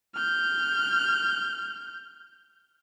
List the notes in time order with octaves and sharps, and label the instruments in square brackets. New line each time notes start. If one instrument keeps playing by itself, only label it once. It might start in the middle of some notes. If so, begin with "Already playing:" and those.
[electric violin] F6 G6